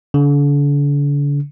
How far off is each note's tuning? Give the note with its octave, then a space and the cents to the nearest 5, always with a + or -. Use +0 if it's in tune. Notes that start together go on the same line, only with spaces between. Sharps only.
D3 -40